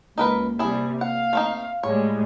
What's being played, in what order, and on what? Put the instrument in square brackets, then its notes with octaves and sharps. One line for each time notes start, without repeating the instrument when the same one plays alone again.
[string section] C#2 [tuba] A#3 [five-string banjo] D#4 A#4 B4
[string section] C3 G3 [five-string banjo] E4 G#4
[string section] F5 [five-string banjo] F#5
[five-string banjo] A3 C4 D#4
[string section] A2 G3 G#3 [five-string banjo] C#5